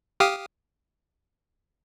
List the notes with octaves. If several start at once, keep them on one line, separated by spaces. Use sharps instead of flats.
G4 F5 D#6